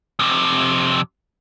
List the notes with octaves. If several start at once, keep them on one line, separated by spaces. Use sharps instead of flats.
F2 C3